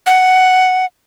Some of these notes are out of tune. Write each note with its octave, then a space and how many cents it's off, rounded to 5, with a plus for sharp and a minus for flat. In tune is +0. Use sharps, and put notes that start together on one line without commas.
F#5 +5